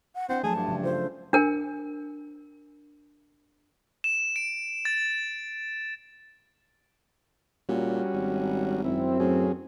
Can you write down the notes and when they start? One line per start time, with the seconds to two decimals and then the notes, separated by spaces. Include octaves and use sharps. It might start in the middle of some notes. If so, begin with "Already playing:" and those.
0.15 F#5
0.29 C4 D4 E4 F#5
0.43 F3 F#3 A3 G#4 A5
0.55 G2
0.68 C#3 F3 D4
0.83 C#3 F4 A4 C5
1.33 D4 A#4 G#5
4.04 E7
4.36 D7
4.85 A6
7.69 A#2 G3 C#4 F#4
8.13 G#1
8.85 F#2 C4 E4
9.20 A2 F#3 C#4 G#4